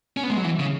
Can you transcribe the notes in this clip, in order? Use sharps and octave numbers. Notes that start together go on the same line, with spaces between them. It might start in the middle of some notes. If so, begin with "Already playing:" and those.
C#4
B3
G#3
F#3
E3
C#3